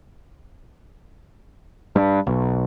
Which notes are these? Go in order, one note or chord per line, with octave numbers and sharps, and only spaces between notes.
G2
B1